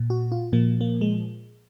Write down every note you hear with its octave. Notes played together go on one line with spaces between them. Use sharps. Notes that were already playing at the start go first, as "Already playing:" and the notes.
Already playing: A#2
F#4
F4
A#2 F3 A#3
A#3
G#3